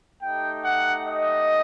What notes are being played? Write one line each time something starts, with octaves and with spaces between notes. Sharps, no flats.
A3 D#4 G4 G5
F#5
D#5